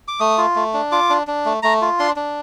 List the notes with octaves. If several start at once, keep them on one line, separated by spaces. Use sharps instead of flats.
D6
A3 D#6
F4
A3
D4
F4 D6
D4
D4
A3
A3 A#5
F4
D4 C6
D4